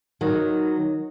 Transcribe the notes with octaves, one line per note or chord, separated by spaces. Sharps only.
D#3 F#3